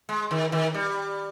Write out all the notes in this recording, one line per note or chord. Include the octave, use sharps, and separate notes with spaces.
G#3
D#3
D#3
G3